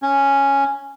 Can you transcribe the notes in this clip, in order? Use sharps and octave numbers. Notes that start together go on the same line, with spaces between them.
C#4